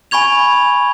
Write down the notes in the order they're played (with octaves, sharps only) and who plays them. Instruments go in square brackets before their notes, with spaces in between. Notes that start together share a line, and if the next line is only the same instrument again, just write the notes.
[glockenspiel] G#5 B5 C#6 G#6 F7